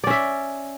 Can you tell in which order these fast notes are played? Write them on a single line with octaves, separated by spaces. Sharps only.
D5 C#4 E5